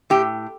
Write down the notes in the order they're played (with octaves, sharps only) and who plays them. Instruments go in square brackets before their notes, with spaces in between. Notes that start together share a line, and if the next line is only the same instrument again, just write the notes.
[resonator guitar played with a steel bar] A2 G4